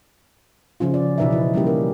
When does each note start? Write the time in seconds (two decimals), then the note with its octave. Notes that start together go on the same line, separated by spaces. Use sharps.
0.80 C#3 F3 C#4 F4
0.94 D5
1.18 B2 E3 D#4 B4 D5 E5
1.31 F3 E4
1.54 G3 A#3 C#4 G4
1.67 A#4